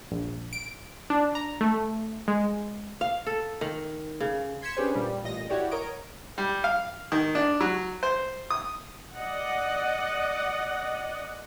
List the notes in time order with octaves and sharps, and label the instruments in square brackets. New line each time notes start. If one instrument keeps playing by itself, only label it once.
[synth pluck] A#1
D7
D4
A#5
A3
G#3
[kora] F5
A4
D#3
C#3
[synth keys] C6 G#6 B6 C#7 E7
C#4 D4 G4 G#4 B4 C5
A#2 G3
A1 A#2 D#5 A#6
E4 F#4 G4 C#5 D5
A#4 C#5 D#5 D7
[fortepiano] G3
F5
D#3
D4
F#3
C5
D#6
[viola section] D5 D#5 F#5